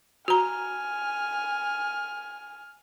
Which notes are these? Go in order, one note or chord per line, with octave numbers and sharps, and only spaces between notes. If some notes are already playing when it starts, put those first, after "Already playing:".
F#4 G#5 A#5 F6